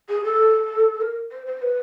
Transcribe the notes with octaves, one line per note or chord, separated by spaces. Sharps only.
G#4
A4
A#4
C5
C5
B4